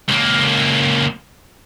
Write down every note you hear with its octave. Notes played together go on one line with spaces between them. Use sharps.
C#2 A#3